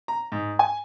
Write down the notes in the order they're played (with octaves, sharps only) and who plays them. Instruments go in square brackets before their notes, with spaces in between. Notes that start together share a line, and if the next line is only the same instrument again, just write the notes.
[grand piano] A#5
G#2
G#5